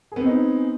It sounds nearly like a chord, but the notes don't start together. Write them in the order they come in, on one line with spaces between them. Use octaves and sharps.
G#4 B3 C4 D#4